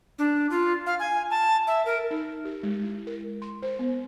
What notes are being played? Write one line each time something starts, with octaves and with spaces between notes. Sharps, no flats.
D4
F4
F5
G#5
A5
E5
A#4
D#4
G4
G#3
E4
A#4
C6
C5
B3